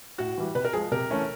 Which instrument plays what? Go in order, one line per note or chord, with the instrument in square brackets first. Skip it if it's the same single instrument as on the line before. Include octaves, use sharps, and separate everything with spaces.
[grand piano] A2 [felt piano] F#4
[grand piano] E3 G3
[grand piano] C3 [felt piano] B4
[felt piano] A#4
[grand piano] F3 G#3 [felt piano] G#4
[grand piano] C3 [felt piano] A#4
[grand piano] E3 A3 C#4 E4